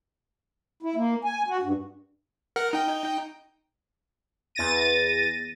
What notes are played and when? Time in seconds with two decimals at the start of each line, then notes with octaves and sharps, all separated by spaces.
0.83 E4
0.96 A#3
1.24 G#5
1.48 F#4
1.63 G2
2.56 A#4 F#5 F6
2.73 D#4 G5
4.55 E2 A6 A#6 D#7